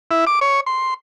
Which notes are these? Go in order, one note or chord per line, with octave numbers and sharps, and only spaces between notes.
E4
D6
C#5
C6